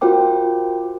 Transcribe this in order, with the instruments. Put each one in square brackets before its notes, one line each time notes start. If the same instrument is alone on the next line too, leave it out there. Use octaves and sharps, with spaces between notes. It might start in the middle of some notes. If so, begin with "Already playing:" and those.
[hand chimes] F4 F#4 A#4 C5 G5 D6